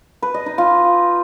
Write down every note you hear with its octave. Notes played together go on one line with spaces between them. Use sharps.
B4
D#5
D#4
F4